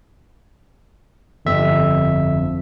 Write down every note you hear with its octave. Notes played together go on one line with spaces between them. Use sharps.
G1 F2 E5